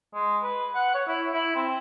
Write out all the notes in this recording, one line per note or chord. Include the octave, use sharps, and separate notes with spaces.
G#3
B4
F#5
C#5
E4
E4
C4